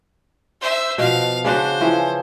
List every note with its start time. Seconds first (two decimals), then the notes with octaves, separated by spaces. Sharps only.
0.61 C5 E5
0.98 B2 F3 F5
1.45 C#3 D4 F#4 C5
1.81 E3 F3 C#4